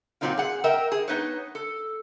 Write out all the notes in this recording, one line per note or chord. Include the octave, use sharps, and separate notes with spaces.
A#2 D#3 F#3 C4 D#4 F4
G#4 F#5
A#4 D#5 E5 G5
G#4
B3 D#4 B4 C#5
A4